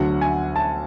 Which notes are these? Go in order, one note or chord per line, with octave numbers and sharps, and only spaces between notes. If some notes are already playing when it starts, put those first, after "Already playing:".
Already playing: D2 D3 F#3 F#5
G#5
A5